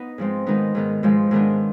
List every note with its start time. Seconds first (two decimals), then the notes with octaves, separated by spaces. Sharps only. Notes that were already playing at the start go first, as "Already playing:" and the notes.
Already playing: B3 D#4
0.18 G#2 F3 G#3 C4
0.46 D#3 G#3 B3 D#4
0.75 G#2 D#3 B3
1.03 G#2 F3 G#3
1.31 G#2 D#3 B3 D4